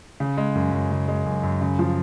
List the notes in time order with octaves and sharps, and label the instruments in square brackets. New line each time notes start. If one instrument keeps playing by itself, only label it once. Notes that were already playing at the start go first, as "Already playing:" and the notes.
[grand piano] C#3
G#3
F#2
F#2
C#3
G#3
F#2
F#2
C#3
F3